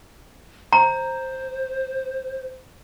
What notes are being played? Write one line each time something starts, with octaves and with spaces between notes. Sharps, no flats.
C5 A#5